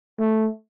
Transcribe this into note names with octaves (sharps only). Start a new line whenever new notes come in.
A3